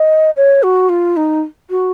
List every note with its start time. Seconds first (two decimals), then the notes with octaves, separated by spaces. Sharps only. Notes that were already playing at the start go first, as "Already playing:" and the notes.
Already playing: D#5
0.36 C#5
0.63 F#4
0.89 F4
1.17 D#4
1.70 F#4